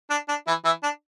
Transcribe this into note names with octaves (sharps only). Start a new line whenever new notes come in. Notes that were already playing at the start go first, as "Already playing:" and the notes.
D4
D4
E3 E4
E3 E4
D4